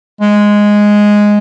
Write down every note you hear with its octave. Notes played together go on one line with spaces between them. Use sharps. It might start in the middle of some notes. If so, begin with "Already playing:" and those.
G#3